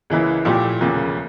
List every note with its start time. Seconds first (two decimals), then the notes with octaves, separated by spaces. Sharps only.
0.10 C#2 C#3 E3 A#3 E4
0.45 A#2 F3 A3 E4 G4
0.81 E1 D2 C#3 F3 A#3